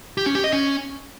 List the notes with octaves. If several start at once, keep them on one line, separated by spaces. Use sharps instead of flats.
G4
C#4
G4
D#5
C#4